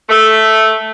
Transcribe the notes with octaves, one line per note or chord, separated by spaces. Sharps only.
A3